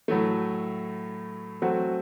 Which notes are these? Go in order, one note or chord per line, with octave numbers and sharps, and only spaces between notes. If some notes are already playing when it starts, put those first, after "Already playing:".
A2 F#3 A3
F#3 A3 C4 F#4